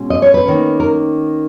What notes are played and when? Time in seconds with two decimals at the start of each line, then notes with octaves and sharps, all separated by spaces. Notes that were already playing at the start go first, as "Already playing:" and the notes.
Already playing: B2 G#3 C#4
0.10 D#5
0.22 C#5
0.34 B4
0.45 D#3 A#3 C#4
0.80 A#4